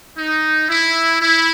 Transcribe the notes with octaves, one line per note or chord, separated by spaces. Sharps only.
D#4
E4
E4